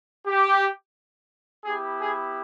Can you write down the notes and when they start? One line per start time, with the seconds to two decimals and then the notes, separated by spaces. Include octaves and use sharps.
0.26 G4
1.64 B3 E4 G4 G#4
1.99 G#4